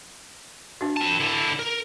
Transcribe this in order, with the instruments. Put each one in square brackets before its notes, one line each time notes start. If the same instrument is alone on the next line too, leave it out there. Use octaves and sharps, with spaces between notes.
[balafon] D4 F#4
[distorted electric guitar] C4 A5
D3 E4
A#4